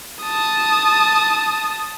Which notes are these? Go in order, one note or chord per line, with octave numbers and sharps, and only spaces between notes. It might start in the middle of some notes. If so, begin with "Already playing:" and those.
A5 D#6